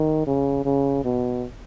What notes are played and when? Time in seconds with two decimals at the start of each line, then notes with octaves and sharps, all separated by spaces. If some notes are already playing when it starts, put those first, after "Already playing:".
Already playing: D#3
0.27 C#3
0.65 C#3
1.04 B2